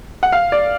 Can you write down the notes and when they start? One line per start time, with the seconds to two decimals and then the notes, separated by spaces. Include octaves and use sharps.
0.23 F#5
0.32 F5
0.52 D5